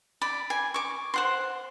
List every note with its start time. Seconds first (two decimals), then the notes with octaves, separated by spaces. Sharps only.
0.22 D5 B5
0.50 G#5
0.74 C#6 D6
1.14 C5 F#5 C6